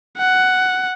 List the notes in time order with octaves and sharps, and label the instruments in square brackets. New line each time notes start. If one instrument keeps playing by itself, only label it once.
[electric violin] F#5